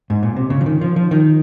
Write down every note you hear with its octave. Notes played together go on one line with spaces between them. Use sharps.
G#2
A#2
C3
C#3
F3
D#3
F3
F3
D#3